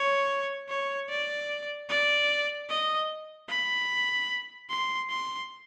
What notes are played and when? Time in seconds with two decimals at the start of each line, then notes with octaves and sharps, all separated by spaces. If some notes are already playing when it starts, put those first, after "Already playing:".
Already playing: C#5
0.69 C#5
1.09 D5
1.89 D5
2.69 D#5
3.49 B5
4.70 C6
5.10 C6